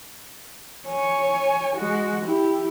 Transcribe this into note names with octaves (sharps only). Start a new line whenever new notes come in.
C#5 G#5
G#3 F#4
E4 G4